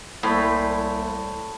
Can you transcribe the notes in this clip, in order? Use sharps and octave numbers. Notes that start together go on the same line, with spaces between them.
C2 A2 A#3 C5 E5 B5